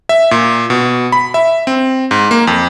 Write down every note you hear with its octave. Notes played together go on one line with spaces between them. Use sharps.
E5
A#2
B2
B5
E5
C4
G#2
A#3
F2